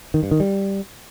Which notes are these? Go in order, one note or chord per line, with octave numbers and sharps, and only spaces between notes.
D#3
G2
D#3
G3